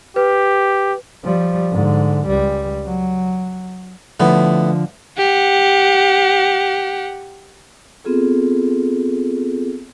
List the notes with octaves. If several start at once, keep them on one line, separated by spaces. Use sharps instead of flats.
G4 B4
F3 G3
G#2 D3
C#2 G3
F#3
A2 D3 F3 B3
G4 F#5
B3 C4 F4 G#4 A4